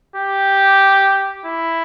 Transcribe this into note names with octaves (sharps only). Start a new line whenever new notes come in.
G4
E4